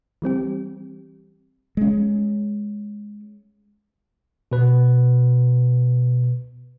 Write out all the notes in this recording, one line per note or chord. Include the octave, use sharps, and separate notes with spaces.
E3 G3 C4 G4
G#3 C#4
B2 B4